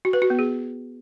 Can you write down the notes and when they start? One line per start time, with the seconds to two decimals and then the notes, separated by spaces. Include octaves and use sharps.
0.05 F#4
0.13 B4
0.22 F#4
0.30 B3
0.39 G#4